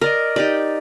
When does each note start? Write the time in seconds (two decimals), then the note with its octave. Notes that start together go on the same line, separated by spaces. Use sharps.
0.01 A#4 D5 D#5
0.36 D#4 G4 D5